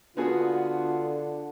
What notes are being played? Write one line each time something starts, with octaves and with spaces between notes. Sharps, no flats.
D3 B3 D4 F4 F#4 G#4